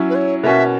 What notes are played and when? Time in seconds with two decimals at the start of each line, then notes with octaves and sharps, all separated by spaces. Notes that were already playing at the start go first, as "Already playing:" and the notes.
Already playing: F#3 C#4 E4
0.10 B4
0.15 C#5
0.43 B2 A#3 C#4 F#4 E5